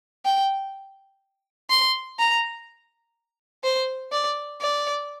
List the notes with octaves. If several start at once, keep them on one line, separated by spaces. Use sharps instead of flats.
G5
C6
A#5
C5
D5
D5